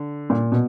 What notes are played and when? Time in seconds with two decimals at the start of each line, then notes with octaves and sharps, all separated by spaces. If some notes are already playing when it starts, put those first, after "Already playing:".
Already playing: D3
0.30 A#2
0.52 B2